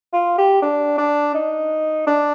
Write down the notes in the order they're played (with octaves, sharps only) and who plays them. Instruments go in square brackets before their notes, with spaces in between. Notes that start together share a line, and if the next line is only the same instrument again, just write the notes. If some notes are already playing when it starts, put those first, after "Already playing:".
[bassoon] F4
G4
D4
D4
D#4
D4